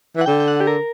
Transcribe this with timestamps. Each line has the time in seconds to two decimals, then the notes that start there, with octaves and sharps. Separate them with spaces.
0.16 E3 F#5
0.26 D3 G5
0.40 G5
0.48 F#5
0.60 G4
0.67 A#4